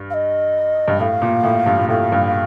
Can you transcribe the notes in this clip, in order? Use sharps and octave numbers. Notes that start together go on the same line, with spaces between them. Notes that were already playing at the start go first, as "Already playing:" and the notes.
Already playing: G2
F5
D#5
G2
A2 F5
A#2
A2
G2
A#2
A2 F5
G2